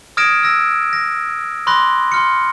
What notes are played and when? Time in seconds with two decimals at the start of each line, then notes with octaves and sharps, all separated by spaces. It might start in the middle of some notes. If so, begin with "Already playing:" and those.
0.17 D#6 F6 G#6 A#6 D7 E7
0.43 E6 A#6
0.93 A#6
1.67 B5 C6 D6 F#6 A#6
2.12 C6 F6 C#7